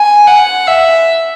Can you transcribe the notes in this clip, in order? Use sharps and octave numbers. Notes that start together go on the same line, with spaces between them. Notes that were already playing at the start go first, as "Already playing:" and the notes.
Already playing: G#5
F#5
E5